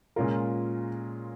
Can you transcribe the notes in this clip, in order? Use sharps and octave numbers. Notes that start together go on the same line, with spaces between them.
A#2 G#3 C#4 F4 A#4